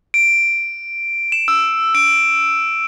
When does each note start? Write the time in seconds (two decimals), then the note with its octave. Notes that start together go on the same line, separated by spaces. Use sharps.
0.14 D7
1.32 E7
1.48 E6
1.95 D7